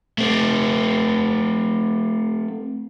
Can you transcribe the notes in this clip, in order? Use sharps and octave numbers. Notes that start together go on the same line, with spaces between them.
A3 C4